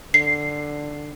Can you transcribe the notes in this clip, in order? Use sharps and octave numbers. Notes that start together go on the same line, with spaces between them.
D3 C7